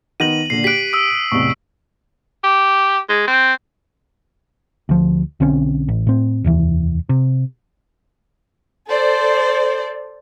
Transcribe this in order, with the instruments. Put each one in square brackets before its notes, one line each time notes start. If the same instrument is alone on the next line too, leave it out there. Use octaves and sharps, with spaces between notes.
[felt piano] D#3 B3 A#6 [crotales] D#7 F#7
[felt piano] A#2 D3 [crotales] C7
[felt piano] G4 F#6 [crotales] B6 D7
[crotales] D#6 E6
[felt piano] A1 E2 C3 [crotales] C#6
[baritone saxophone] G4
G#3
C4
[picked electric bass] D2 F3
B1 D3 C4 C#4
A1
A2 C4
F1 D#2 E3
C3
[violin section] A4 C5 D5